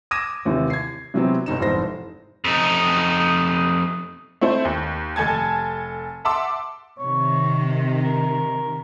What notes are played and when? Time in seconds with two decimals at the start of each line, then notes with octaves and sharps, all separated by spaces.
0.11 D6 D#6 G#6 A#6 D#7 E7
0.45 D#2 C3 E3
0.70 G#6 C7
1.14 C3 E3 F#3 B3 C4
1.46 G1 B2 D#4 E7
1.59 F1 G#2 E3 C5 A#6
2.44 F2 D#4
4.41 A3 C4 E4 C5
4.65 D#2
5.16 F1 A4 G#5 A5 G#6
6.25 E5 F#5 A5 C6 D6 E6
6.98 C3 D#3 C#5
8.03 A#4